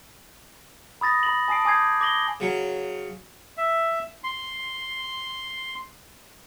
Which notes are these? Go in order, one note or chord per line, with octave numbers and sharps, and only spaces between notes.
B5 D#6 A6 A#6
B5 F#7
G#5 A5 D#6 C7 D7
G#5 D6 D#6 G6 G#6 C7
D6 A#6 F#7 G7
C#3 F#3
E5
C6